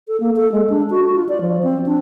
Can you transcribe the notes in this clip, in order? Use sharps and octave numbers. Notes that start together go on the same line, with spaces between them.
A4
A#3
A4
G#3
D4
F#4
F#4
F4
D5
F3
C4
D4